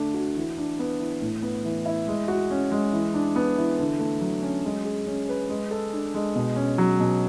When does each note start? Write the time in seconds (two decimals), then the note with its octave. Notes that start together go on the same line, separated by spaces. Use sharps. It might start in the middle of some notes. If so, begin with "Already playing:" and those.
Already playing: D3 A3 D4
0.14 F#4
0.36 E3
0.57 D4
0.79 B3
1.00 E3
1.22 A2
1.42 B3
1.65 E3
1.86 E4
2.08 G#3
2.28 F#4
2.51 C#4
2.71 G#3
2.93 E3
3.14 D4
3.36 B3
3.57 E3
3.79 D3
3.99 A3
4.21 F#3
4.43 C#4
4.64 G#3
4.85 G#4
5.06 C#4
5.29 B4
5.49 G#3
5.71 A4
5.93 D4
6.14 G#3
6.35 B2
6.56 C#4
6.78 F#3
7.00 B2